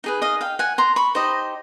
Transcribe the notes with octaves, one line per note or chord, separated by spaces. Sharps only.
D#4 G#4 B4
D#5 F5
F5 G5
F#5 G#5
A#5 C6
B5 C#6
D#4 G4 C5 D#5